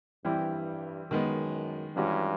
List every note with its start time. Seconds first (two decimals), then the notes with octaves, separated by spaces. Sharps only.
0.25 G2 E3 G3 C4 E4 G4
1.10 F#2 D#3 G#3 B3
1.96 G2 E3 G#3 C#4 F#4